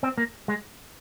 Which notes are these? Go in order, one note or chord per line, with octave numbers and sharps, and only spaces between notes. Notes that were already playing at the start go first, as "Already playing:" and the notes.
C4
A#3
G#3